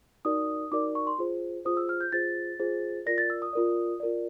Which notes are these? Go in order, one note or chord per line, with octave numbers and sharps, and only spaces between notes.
D#4 F#4 A#4 D5 D#6
D#4 F#4 A#4 D5 D6
C#6
C6
F4 G#4 C5
F4 G#4 C5 D#6
E6
F6
G6
F4 G#4 C5 A6
F4 G#4 C5
F4 A#4 D5 A#6
A6
E6
D#6
F4 A#4 D5
F4 A#4 D5